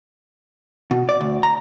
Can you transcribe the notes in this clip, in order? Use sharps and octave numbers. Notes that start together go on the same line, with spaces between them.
B2
D5
D2
A#5